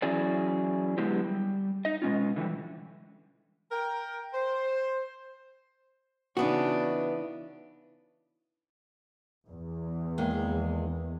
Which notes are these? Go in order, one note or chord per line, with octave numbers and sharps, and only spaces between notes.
E3 F#3 C#4 E4 G#4 D5
D3 F#3 G#3 B3 E4 G4
G3
D#4 D#5
B2 G#3 C#4 F4
D3 E3 F3 G3
A#4 G5
C5
C#3 E3 B3 D4 D#4 F#4
E2
D#3 G#3 A#3